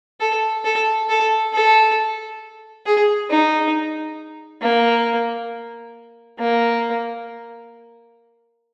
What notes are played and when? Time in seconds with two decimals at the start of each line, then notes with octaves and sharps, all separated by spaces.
0.20 A4
0.65 A4
1.09 A4
1.53 A4
2.86 G#4
3.30 D#4
4.62 A#3
6.39 A#3